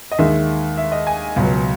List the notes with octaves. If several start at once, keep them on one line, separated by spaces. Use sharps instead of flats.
D#5
D#2 D#3 G#3 E5
E5
D#5
G#5
C#2 B2 F#3